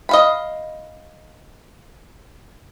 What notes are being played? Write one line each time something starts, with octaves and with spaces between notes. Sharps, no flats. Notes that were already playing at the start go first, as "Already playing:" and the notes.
D#5 F5 B5